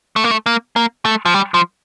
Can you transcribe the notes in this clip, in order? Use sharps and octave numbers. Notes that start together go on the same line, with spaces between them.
A3
A#3
A3
A#3
A#3
A3
F3
G3
F3